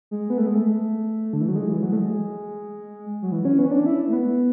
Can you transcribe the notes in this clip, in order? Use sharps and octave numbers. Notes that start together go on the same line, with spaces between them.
G#3
B3
A3
G#3
A3
D3
E3
F#3
G#3
E3
F#3
A3
G#3
F#3
E3
C#4
B3
C#4
D4
E4
A3
B3